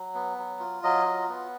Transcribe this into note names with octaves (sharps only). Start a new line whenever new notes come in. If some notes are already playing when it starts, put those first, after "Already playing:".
Already playing: F#3
B3
F#3
F4
F#3 D#5
F4
B3